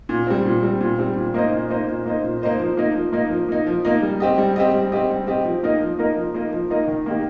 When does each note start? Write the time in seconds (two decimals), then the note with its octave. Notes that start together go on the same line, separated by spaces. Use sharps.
0.09 A#2
0.27 G3 C4
0.45 A#2
0.63 G3 C4
0.81 A#2
0.99 G3 C4
1.16 A#2
1.34 A#3 D#4 C5 D#5
1.52 A#2
1.70 A#3 D#4 C5 D#5
1.88 A#2
2.06 A#3 D#4 C5 D#5
2.24 A#2
2.42 A#3 D#4 C5 D#5
2.59 F3
2.77 A#3 D#4
2.95 F3
3.13 A#3 D#4
3.31 F3
3.49 A#3 D#4
3.66 F3
3.85 A#3 D#4
4.02 G3
4.20 C4 G4 D#5
4.38 G3
4.56 C4 G4 D#5
4.74 G3
4.92 C4 G4 D#5
5.10 G3
5.27 C4 G4 D#5
5.45 F3
5.63 A#3 D#4 A#4 D#5
5.81 F3
5.99 A#3 D#4 A#4 D#5
6.17 F3
6.34 A#3 D#4 A#4 D#5
6.52 F3
6.70 A#3 D#4 A#4 D#5
6.88 D#3
7.06 A#3 D#4 G4